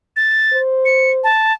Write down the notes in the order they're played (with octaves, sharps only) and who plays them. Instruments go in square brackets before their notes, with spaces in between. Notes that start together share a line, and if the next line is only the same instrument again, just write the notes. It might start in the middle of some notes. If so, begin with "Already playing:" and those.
[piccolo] A6
[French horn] C5
[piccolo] C#7
A5